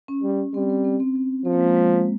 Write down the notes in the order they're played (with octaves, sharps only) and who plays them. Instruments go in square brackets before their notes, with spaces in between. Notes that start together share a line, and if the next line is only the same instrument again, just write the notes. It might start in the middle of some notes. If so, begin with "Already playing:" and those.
[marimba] C#4
[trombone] G3
[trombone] G3 [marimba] C4
[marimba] C4
C4
C4
C4
[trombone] F3 [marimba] C4
[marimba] A#3
G#3
A#3
G#3
G#3